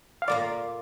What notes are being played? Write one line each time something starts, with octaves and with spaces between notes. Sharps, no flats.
F5
A#2 A#3 F4 D5